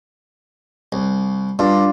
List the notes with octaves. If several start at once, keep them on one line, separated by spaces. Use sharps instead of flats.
C2
G2 D4 F4 D5